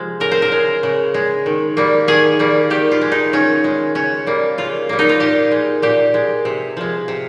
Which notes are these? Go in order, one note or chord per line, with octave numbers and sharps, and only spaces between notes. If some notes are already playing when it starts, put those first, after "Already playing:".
Already playing: C3 F3 G#3
C#3 A#4
C5
A#4
G#3
C#3
G#3
D#3
G3 A#3
D#3 G#4
G3 A#3
D#3 G4
F4
G#3
D#4
D#3 C#4
G#3
C#3 C#4
G3 A#3
C#3 F4
G3 A#3
D#4
F4
A#2 G4
G#3
A#2 G4
G#3
C3
F3 G#3
C3